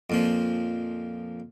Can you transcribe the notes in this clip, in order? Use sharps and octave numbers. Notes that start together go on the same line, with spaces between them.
F2 A#2 F3